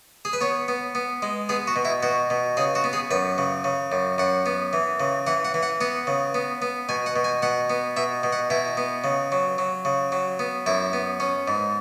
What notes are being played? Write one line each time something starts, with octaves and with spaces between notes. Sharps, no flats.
G#4
B4
B3 C#5
B3
B3
G#3
B3 G#4
F#4
B2
E4
B2 F#4
B2
C#3 G#4
F#4
B3
G#4
F#2 B4
C#3
C#3
F#2
F#2 F#5
B3
E3
C#3
E3 F#5
F#5
E3
F#5
B3 F#5
C#3
B3
B3
B2 G#5
F#5
B2
G#5
B2 F#5
B3
B2 E5
B2
F#5
B2 E4
B3
C#3
F#3
F#3
C#3
F#3
B3
F#2 E4
B3
C#4
G#2